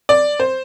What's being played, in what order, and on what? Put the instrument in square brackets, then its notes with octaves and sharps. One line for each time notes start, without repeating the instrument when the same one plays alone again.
[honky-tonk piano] D5
C5